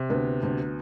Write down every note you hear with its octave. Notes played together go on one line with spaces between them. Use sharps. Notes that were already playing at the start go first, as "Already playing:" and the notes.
Already playing: C3
D2 B3
D2